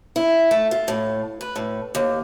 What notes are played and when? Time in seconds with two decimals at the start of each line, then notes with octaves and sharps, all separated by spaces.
0.16 E4
0.51 A3
0.71 F4
0.88 A2
1.41 B4
1.56 A2
1.95 D#2